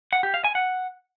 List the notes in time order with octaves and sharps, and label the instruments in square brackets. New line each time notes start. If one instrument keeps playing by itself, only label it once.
[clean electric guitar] F#5
G4
F5
G#5
F#5